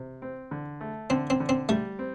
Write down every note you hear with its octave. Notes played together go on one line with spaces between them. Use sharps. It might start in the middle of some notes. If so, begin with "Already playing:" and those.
Already playing: C3
C4
D3
A3
D3 C4
C4
D3
C4
G3 A3
C4